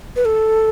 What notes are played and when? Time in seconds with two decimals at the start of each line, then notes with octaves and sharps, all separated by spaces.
0.16 B4
0.25 A4